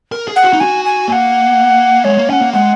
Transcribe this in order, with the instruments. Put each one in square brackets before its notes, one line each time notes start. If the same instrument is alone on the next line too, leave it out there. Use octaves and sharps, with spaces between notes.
[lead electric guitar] A#4
G#4
[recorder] F#5
[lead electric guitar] F#4
D#4
[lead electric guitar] F#4 [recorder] G#5
[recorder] G#5
[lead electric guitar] A#3 [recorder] G#5
[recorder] F#5
[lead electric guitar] G#3 [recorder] C#5
[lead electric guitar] A#3
[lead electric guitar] C#4 [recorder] F#5 G#5
[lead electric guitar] A#3
[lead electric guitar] G#3 [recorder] F#5